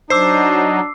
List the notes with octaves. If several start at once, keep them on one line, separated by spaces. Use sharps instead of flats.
F#3 D4 D#4 C5 D6 E6 C7